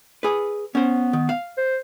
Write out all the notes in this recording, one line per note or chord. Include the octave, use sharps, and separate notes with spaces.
G#4 B4
B3 C#4 C5
D#3
F5
C5